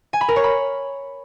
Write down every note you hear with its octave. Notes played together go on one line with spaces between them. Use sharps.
G#5
B5
A#4
C#5
B5